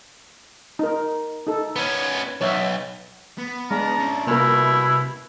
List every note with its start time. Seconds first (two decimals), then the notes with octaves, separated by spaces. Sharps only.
0.79 D#4 A#4
1.47 D#4 A4
1.76 B3 C#4
2.41 B1 C#5 E5
3.38 B3
3.71 G#3 D4 A#5
3.99 C#4 E4
4.27 C2 B2 A#3 E4 A#4